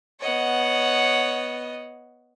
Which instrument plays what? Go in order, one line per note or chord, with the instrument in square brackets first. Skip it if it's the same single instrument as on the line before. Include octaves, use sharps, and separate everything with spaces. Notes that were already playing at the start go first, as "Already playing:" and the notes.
[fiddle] B3 D#5 [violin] C#5 F#5